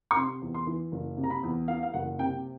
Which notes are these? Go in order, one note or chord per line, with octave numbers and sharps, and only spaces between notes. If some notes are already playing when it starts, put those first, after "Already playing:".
C#6
C3 C6
E2
C6
E3
F#1
C3
A#5
B5
E2
E3 F5
F5
F#1 F#5
C3 G5